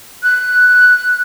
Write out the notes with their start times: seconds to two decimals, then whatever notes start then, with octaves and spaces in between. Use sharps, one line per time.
0.23 F#6